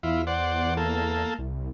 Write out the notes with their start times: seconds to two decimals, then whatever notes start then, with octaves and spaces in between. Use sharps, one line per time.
0.03 E2 E4 F4
0.27 C5 D5 F#5
0.77 A#3 A4
1.38 C2